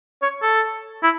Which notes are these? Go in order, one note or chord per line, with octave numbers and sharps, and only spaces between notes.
C#5
A4
E4